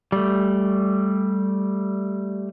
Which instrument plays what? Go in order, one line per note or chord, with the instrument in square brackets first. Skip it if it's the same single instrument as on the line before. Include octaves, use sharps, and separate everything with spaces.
[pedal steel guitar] G3 A3